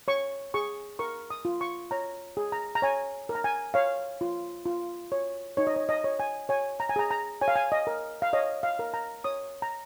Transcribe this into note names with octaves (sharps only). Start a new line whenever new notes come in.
C#5 C#6
G#4 C#6
A#4 C#6
D#6
F4
C#6
C#5 A#5
G#4
A#5
A#5
C#5 G#5
A#4
A#5
G#5
C#5 F5
F4
F4
C#5
D#4 C#5
D#5
C#5
D#5
C#5
G#5
C#5 G#5
A#5
G#5
G#4 A#5
A#5
C#5 G#5
F5
G#5
D#5
A#4
F5
C#5 D#5
F5
A#4
A#5
C#5 D#6
A#5